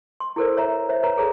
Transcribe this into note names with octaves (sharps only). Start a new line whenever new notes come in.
C6
E4 G4 A4 A#4 C5 D5
C#5 E5 A#5
C5 C#5 E5
B4 C#5 A#5
G#4 A4 B4 C#5 D5 A#5